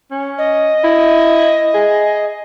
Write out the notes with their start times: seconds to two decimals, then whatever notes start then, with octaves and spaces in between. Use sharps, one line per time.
0.11 C#4
0.38 D#5
0.84 E4
1.74 G#4